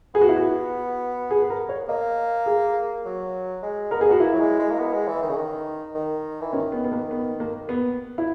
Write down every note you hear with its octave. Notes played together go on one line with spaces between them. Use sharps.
B3 G#4
F#4
E4
F#4
G#4
B4
A#4
C#5
A#3 D#5
G#4
F#3
G#3
B3 A#4
G#4
B3 F#4
A#3 E4
F#3
G#3
G#3
A#3
B3
G#3
E3
D#3
C#3
D#3
D#3
E3
D#3 C#4
B3
B3
A#3
B3
A#3
B3
E4